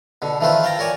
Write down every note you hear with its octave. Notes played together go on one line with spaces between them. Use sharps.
B2 D3
D#3 E3 A3 F4 B4 C5
F5 G5 A5 A#5
A#4 C#5 D5 G#5